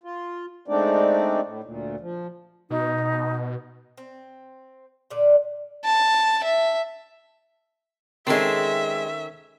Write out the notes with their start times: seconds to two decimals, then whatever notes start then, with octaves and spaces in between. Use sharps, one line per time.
0.04 F4
0.68 G#3 A3 C4 D4 D#4 D5
1.43 A2
1.63 D2 A#2
2.00 F3
2.70 B2 D#4
3.97 C4
5.11 A#2 D3 D5
5.85 A5
6.44 E5
8.27 D#3 G#3 C4 C#4 A4 E5